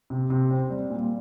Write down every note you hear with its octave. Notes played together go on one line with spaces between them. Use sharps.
C3
C3
C4
G3
A#2